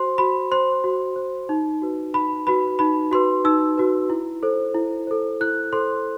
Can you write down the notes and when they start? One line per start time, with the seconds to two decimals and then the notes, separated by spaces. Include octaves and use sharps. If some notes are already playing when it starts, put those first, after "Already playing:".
Already playing: F#4 C5 C6
0.18 F#4 B5
0.51 C5 C6
0.84 F#4
1.16 C5
1.49 D#4
1.82 F#4 B4
2.14 D#4 B5
2.47 F#4 B4 B5
2.79 D#4 B5
3.11 F#4 B4 C6
3.45 D#4 E6
3.77 F#4 B4
4.10 E4
4.43 A4 C5
4.75 E4
5.07 A4 C5
5.40 E4 F#6
5.73 A4 C5 C6